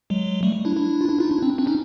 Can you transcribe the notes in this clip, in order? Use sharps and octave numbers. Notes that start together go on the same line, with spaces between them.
F#3 G#3
G3 A3
D4 E4
D4 E4
F4
D4 E4
D#4 F4
D4 E4
C4 D4
C4 D4
C#4 D#4